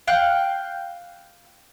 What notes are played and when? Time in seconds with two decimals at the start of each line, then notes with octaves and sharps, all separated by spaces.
0.07 F5 G5 F#6